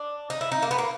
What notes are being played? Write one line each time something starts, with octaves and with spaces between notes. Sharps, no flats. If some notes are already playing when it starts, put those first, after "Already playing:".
Already playing: D4
D#4
E4
D#4
A#3
B3
A#3